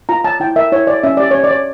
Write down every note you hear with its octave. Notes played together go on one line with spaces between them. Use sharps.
F4 A#5
C#5 A5
E4 G5
A#4 E5
E4 C#5
C#5 D5
C#4 E5
G4 D5
C#4 C#5
D5
C#5